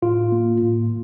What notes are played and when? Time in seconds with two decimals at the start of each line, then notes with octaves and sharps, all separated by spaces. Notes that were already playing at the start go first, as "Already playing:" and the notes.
0.02 A2 F4
0.32 A#3
0.62 A2